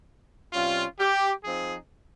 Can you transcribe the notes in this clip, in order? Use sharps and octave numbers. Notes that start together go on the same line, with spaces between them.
C3 G3 C#4 F4
G4
F3 C4 D#4 G#4